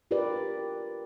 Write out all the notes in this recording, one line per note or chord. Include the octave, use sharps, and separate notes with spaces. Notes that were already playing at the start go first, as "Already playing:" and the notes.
F4 G4 A#4 B4 D5